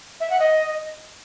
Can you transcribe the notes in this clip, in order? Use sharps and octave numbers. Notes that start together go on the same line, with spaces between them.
E5
F#5
D#5